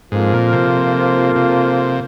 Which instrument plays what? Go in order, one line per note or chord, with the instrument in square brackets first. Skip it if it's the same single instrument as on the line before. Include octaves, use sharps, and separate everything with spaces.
[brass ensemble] F2 F3 A#3 F4 [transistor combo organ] G#2
[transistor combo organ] A#2
C3
C3